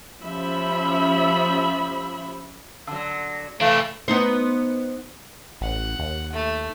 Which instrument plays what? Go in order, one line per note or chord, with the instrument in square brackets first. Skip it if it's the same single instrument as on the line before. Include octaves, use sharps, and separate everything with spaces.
[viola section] F3 C#4 G4 E5 B5
[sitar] D3 F#3 [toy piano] F#5 A5 E6
[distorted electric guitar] C3 D4 [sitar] E3 [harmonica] A3 [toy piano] F5
[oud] B3 D#4 C5
[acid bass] A1 [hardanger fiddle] F#5
[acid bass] D#2
[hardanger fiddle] A3